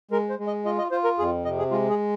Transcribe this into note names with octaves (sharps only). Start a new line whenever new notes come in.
G#3 A#4
C5
G#3
D#5
F4 D#5
D#5
F4 C5
A#4
F2 G#4
C3 D#5
G#4
G#3 F4
G#4